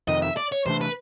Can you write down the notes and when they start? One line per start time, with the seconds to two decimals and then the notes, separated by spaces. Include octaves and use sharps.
0.08 F2 C3 D#3 D#5
0.22 E5
0.37 D5
0.52 C#5
0.66 C3 E3 A3 D4 C5
0.81 B4